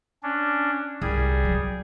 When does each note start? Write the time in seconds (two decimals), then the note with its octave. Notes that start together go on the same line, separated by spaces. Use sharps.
0.23 C#4 D4
1.01 C2 G3 G#4
1.45 F#3